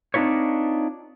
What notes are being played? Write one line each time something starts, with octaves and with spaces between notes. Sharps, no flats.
C4 D4 D#4 F4 B4 C#5